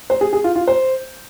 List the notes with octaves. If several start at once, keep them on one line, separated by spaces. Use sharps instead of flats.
C5
G#4
G#4
F4
F4
C5